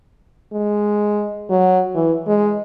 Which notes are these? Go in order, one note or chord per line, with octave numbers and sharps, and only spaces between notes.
G#3
F#3
E3
G#3